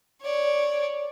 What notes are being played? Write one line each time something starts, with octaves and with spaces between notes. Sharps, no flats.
C#5 D5